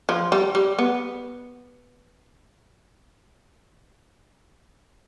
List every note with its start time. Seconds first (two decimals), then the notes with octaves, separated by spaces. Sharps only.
0.09 F3
0.32 G3
0.55 G3
0.79 B3